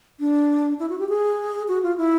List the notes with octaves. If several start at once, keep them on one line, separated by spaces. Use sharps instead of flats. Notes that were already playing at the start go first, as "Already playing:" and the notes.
D4
E4
F#4
G4
G#4
F#4
F4
E4